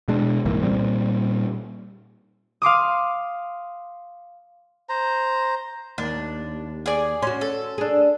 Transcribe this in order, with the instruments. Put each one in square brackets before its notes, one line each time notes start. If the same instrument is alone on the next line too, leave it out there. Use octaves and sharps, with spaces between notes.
[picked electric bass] B2 G#3 D4
C2 G#2 E3 A#3
A#2 G3 C4
[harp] F5 C6 D6 D#6
[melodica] C5 A#5
[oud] D#2 [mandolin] D4
[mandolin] G#4 D5
[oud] C#4 F#4 [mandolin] C6
[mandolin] A4
[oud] D4 G#4